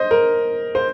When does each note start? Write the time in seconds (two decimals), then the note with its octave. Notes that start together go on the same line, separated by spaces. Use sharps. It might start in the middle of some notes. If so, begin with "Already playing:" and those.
Already playing: C5 D#5
0.11 A#4
0.75 C5